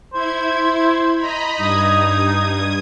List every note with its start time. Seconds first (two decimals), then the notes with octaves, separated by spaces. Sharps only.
0.13 E4 C5 G#6
1.18 D#5 A#5 B5
1.58 G2 D#4 D#6 G#6